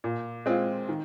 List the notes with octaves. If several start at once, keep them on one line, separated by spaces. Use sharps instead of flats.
A#2
G#3 C4 F4
D#3